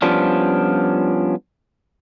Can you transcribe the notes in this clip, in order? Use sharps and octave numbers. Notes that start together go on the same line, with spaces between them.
F3 G3 B3 C#4 D4 F4